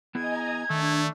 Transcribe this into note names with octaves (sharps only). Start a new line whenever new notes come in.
B3 E4 G#4 D#5 G#5 A#5 G#6
D#3 A3 D4